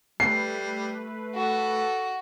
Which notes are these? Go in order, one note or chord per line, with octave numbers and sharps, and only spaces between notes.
G3 A3 B4 C7
F#4 A4